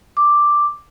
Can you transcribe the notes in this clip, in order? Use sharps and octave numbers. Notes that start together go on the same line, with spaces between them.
D6